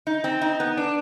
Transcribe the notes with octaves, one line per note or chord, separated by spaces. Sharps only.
D#4
C4
D#4
B3
D4